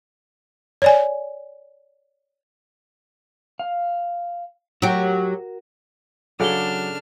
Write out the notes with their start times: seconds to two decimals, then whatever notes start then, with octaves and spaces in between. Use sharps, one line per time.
0.82 C#5 D5 G#5
3.59 F5
4.82 F#3 F#4 G4 A#4
6.40 C#3 F#3 D4 A4 D5 F#5 F6 G7